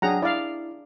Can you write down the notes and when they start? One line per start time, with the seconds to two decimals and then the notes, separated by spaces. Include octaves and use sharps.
0.02 F#3 D4 G#4 F#5 G5 A#5
0.22 E4 D5 F5